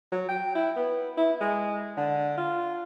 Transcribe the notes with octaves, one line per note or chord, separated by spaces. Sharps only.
F#3
G5
E4
B3
E4
G#3
D3
F4